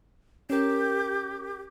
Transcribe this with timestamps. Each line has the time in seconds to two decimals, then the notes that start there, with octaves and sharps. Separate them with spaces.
0.50 C#4 G4 A#4